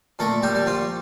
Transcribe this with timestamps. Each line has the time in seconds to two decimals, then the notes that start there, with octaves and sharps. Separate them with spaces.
0.19 A#2 A3 A4
0.43 G3 G4
0.55 G3
0.66 F3 F4